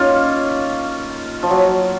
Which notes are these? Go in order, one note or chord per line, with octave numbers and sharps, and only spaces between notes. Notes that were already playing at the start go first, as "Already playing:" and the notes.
Already playing: A#3 C#4 D#4 F4
F3
F#3